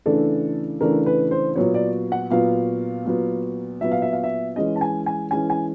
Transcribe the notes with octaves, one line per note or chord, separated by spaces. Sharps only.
C#3 E3 A3 D4 A4
C#3 E3 A3 D4 A#4
B4
C5
A#2 F#3 B3 C#5
D5
F#5
A#2 F#3 B3 F5
A#2 F#3 B3
A#2 F#3 B3 E5
F5
E5
F5
E5
E3 G#3 C#4 D#5
A5
G#5
G#5
E3 G#3 C#4 G#5
G#5